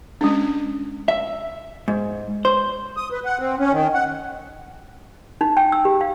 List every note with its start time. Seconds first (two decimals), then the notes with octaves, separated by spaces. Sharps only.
0.21 G#3 C#4 D4
1.08 E5
1.88 G#2
2.45 C5
2.97 D#6
3.12 B4
3.25 F#5
3.40 C4
3.59 C#4
3.72 D#3
3.94 F#5
5.41 D#4
5.57 G5
5.72 E6
5.85 G4
6.01 F5